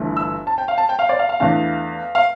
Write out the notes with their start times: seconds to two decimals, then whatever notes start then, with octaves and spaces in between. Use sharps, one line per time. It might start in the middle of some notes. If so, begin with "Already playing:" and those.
Already playing: G1 G2 E3 A3 D4
0.17 E6
0.47 A5
0.58 G5
0.68 F5
0.78 A5
0.89 G5
0.99 F5
1.09 D5
1.19 F5
1.29 F5
1.40 E2 E3 A3 D4 F5
2.15 F5